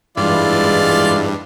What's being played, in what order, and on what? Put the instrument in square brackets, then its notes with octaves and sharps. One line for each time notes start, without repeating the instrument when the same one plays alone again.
[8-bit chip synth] G2 [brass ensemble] E3 G#3 E4 [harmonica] F4 D5